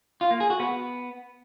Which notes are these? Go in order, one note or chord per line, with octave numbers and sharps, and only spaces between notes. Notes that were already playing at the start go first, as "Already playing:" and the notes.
F4
A#3
G#4
F#4
B3